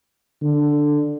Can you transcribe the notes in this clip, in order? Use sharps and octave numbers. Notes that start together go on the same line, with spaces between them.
D3